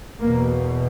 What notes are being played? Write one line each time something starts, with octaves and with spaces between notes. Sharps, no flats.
E2 B2 A#3